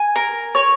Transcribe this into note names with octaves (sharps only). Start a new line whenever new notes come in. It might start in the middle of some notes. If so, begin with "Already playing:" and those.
Already playing: G#5
A#4
C#5